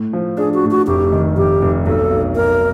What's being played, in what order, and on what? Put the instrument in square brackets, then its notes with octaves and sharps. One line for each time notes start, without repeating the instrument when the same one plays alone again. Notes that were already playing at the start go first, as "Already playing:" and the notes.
Already playing: [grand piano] A2
F3
[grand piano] D4 [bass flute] G#4
[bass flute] F#4
[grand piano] A2
[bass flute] F#4
[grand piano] F1 [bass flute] G4
[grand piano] D#3
[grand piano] F1 [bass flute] G4
[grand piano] F1
[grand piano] B1 [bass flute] A4
[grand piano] B1
[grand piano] B1 [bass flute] A#4